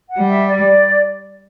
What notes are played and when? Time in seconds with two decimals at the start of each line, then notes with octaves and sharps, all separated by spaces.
0.08 F#5
0.19 G3
0.29 E5
0.48 D5